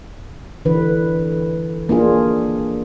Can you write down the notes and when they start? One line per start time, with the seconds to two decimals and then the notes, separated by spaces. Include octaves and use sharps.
0.65 D3 E3 B4
1.89 A#3 D4 F4 G#4